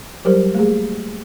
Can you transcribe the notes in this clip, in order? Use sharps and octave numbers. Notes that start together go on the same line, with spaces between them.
F#3 G3 G4 A#4 C5
A3 A#3 G#4